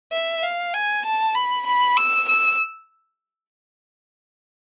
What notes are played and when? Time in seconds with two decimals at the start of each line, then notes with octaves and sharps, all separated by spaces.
0.12 E5
0.43 F5
0.74 G#5
1.05 A5
1.35 B5
1.66 B5
1.97 E6
2.28 E6